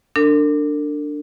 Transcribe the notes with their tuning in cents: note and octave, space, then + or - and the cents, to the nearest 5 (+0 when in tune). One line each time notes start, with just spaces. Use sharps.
D4 +5 A#4 -45